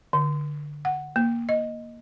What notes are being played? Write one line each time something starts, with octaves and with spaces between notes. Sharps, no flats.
D3
F#5
A#3
D#5